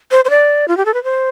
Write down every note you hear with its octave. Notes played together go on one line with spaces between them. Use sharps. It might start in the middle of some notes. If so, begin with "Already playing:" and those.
C5
C5
D5
F4
G4
A4
B4
C5